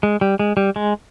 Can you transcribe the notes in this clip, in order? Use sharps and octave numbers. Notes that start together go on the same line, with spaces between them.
G#3
G3
G#3
G3
G#3